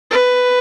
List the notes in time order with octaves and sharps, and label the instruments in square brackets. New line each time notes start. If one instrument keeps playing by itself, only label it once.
[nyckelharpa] B4